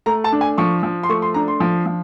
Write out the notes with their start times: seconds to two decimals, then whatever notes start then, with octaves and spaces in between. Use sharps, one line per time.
0.06 A3 A#5
0.24 A5
0.32 D4
0.41 G#5
0.58 F3 C#6
0.83 F3
1.03 C6
1.09 A3 C#6
1.22 C6
1.34 D4 A#5
1.48 C6
1.60 F3
1.86 F3